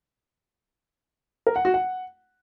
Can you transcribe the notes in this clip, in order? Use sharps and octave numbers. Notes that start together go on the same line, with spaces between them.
A#4
F#5
F#4
F#5